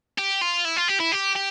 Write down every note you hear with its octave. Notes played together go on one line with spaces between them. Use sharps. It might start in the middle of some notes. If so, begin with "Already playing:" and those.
G4
F4
E4
F4
G4
E4
G4
G4